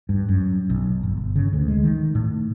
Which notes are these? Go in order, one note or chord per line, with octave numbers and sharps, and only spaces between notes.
G2
F#2
B1
G1
C#3
D2
G#3
D#3
A2